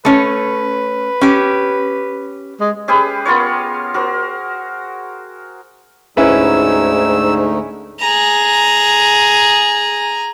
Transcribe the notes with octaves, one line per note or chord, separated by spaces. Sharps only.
A3 C#4 B4 C#5
C#4 G4
G#3
C#4 G4 G#4 B4
B3 F4 A#4 C#5
F#4 A#4 C5
D2 G#2 A3 C#4 D#4 E4 B4 E6
G#4 A#5